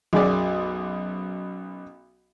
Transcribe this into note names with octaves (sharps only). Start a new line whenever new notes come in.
B1 F#2 G#4 D5